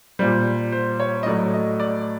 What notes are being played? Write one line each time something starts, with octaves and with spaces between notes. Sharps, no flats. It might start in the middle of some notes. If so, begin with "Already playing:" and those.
A#2 G3 C5
C5
C#5
D#5
A2 F#3 A3 D5
D#5
D5